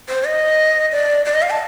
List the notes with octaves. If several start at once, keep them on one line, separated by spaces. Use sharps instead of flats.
C5
D#5
D5
D5
D#5
F5
A5